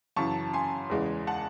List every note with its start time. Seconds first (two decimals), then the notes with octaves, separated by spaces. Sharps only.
0.16 F#2 C#3 E3 A5 C#6
0.53 G#5 C6
0.90 E2 C#3 E3 G#3
1.27 F#5 A5